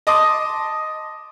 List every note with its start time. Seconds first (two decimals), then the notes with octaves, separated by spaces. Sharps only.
0.07 D#5 A5 C6 D6 D#6